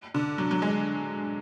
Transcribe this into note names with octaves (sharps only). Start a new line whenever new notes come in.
D3
F#3
F#3
G#3